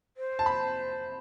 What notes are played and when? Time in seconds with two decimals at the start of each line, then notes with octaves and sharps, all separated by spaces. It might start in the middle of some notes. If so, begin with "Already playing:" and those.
0.17 C5
0.39 A5
0.46 B5